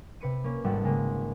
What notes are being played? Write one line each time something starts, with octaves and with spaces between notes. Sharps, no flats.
C3 B4 C#7 D#7
A#3 C#4
G#1 G3 F#4 A4 F#5
C#3 G#3 A#3